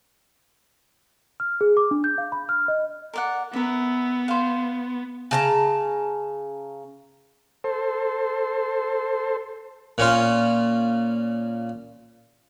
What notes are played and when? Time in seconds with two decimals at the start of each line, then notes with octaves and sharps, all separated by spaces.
1.40 F6
1.61 G#4
1.77 D6
1.91 D4
2.04 G6
2.18 F5
2.32 B5
2.49 F6
2.68 D#5
3.13 A#4 D5 F#5
3.53 B3 A#4 E5
4.28 C5 F5
5.31 C#3 A5 A#5
7.64 A4 C5
9.98 A#2 C#4 F4